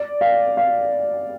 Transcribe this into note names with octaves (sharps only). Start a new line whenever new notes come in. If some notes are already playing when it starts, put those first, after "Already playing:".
Already playing: D5
F5
F5